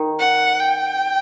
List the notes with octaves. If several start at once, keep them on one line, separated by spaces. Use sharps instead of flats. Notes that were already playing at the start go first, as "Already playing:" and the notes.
Already playing: D#3
F#5
G5